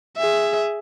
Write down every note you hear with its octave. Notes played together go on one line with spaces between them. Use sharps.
G#4 E5